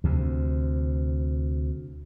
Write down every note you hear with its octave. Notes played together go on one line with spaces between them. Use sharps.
D2 C3